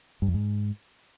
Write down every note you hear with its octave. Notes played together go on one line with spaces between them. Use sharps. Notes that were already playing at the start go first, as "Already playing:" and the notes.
G2
F2
G#2